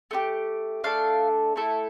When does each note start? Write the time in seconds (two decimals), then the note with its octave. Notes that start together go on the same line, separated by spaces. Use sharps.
0.11 A3 E4 G4
0.84 A3 D4 A4 F5
1.56 A3 E4 A4